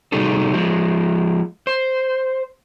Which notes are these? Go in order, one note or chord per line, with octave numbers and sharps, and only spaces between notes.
C3 G3 D#4 F#4 G#4 A4
F3 G#3
C5